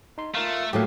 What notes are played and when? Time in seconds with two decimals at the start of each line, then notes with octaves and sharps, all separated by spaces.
0.18 D#4 C6
0.35 A3 F4 A#4 F5
0.73 A2 F#3 A#3 G4 G#4 F5